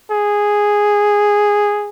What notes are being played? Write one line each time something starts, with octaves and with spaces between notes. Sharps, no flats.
G#4